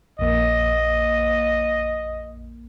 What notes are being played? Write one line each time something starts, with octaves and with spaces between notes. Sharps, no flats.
A#1 F2 A#3 D#5